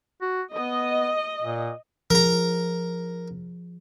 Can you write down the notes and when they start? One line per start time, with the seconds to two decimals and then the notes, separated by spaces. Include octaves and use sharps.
0.22 F#4
0.54 B3 D#5
1.42 A#2
2.10 F3 G#4 A#4 A#5